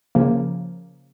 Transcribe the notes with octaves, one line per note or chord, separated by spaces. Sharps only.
C#3 F3 A#3